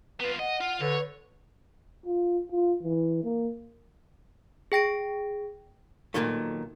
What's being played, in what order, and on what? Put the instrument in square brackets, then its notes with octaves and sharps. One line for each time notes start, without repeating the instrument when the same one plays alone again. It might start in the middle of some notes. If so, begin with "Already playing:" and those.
[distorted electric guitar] B3 F4 [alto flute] B4
[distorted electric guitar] D#5 [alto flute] F#5
[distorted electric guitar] F4
[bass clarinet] D3 [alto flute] B4 [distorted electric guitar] C#5
[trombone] F4
F4
E3
A#3
[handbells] G#4 G5 A#6 D7
[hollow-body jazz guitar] B1 E2 A#2 D#3 A3